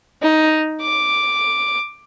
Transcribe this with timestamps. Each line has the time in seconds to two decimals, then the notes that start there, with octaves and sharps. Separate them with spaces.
0.22 D#4
0.82 D6